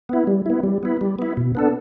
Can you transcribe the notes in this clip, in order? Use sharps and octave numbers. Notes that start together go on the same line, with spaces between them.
B3 E4
G3
B3 E4
G3
B3 E4
G3
B3 E4
B2
B3 D4 A4